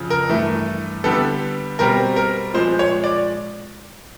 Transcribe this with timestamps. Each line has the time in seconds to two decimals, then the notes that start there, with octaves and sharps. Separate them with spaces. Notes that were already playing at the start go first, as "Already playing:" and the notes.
Already playing: F2 C#3 F3
0.10 A#4
0.29 G2 E3 A3
1.04 D3 G3 B3 A4
1.79 B2 G3 C4 A#4
2.16 A#4
2.54 A#2 F3 G#3 C5
2.79 C#5
3.04 D5